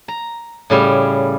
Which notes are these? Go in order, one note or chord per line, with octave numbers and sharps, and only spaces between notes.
A#5
A2 C#3 G3